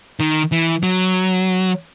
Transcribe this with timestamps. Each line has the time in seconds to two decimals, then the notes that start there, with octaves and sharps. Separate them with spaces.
0.20 D#3
0.52 E3
0.83 F#3